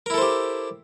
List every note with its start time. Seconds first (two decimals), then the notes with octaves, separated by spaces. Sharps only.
0.06 A#4
0.10 E4
0.14 A4
0.18 C5
0.22 G4